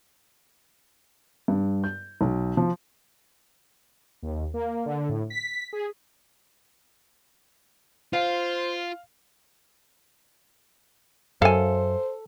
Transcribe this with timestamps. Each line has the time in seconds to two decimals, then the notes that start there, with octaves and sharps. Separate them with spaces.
1.48 G2
1.84 G6
2.21 B1
2.57 F3
4.22 D#2
4.54 A#3
4.86 D3
5.09 A2
5.30 B6
5.73 G#4
8.13 F4 C5 F5
11.42 F#2 A4 C5 F5 G#5